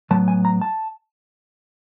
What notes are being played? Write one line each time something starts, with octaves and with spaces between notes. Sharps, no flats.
A2 F#3 B3 A5
G#5
A#5
A5